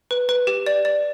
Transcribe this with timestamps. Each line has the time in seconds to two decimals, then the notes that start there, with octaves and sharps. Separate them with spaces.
0.11 B4
0.29 B4
0.47 G4
0.67 D5
0.85 D5